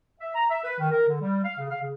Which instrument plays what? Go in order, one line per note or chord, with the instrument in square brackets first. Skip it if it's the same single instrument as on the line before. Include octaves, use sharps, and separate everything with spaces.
[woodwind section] E5
A#5
E5
B4
D#3
A#4
D3
G3
F5
C#3
F5
C#3